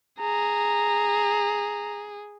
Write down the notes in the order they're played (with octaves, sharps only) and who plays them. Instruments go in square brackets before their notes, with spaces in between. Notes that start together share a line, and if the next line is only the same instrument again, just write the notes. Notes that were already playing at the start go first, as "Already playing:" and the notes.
[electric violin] G#4 [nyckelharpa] A#5